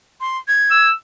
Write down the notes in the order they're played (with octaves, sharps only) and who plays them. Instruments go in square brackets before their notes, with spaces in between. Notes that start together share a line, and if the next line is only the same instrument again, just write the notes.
[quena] C6
G#6
[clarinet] E6